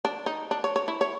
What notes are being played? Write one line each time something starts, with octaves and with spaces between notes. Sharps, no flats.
D4
D#4
D4
C#5
C#5
E4
C#5